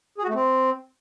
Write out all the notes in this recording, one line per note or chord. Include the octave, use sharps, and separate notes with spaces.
G#4
F#4
A3
C4